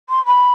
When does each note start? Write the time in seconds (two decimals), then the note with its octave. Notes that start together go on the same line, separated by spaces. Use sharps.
0.09 C6
0.26 B5